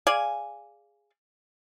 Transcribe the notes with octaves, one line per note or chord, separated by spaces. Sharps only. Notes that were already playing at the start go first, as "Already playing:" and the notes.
G#4 D5 F5 G#5